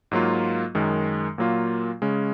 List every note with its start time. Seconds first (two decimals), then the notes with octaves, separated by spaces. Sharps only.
0.11 G#2 F#3 A#3 F4
0.75 F#2 D#3 G#3
1.38 A#2 F#3 A#3 F4
2.02 C#3 G#3 C#4